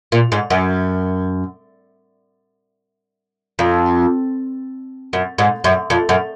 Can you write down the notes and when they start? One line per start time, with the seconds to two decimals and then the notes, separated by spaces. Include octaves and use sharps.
0.12 A#2
0.32 G#2
0.50 F#2
3.59 F2
5.13 F#2
5.38 G#2
5.64 F#2
5.90 F2
6.09 F#2